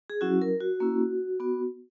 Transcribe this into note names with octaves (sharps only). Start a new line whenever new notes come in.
G#4
F#3 C#4 E4 F#4
A#4
F#4
A#3 C#4 E4
B3 F#4